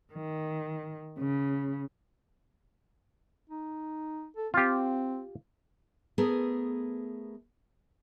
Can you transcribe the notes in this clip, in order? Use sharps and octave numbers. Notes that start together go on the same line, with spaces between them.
D#3
C#3
D#4
A4
C4 F4 G4
A3 B3 G#4 A#4